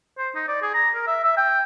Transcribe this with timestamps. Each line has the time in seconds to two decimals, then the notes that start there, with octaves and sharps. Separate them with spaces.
0.18 C5
0.35 D#4
0.48 D5
0.62 G#4
0.74 A#5
0.95 A#4
1.07 E5
1.24 E5
1.37 G5